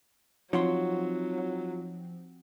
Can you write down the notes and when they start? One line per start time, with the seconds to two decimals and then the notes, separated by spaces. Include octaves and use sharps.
0.53 F3 F#3 C4 D#4 F4 C#5 F#5 C6